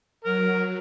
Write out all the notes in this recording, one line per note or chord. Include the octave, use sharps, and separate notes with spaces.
F#3 A#4